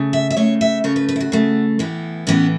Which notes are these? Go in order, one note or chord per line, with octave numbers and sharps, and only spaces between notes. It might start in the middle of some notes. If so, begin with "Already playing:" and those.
Already playing: C#3 A3
E5
E5
C#3 A3 C#5
E5
C#3 A3 C#5
B4
B4
E4
F#4
C#3 A3
A2 E3 B3
A2 E3 B3 C#4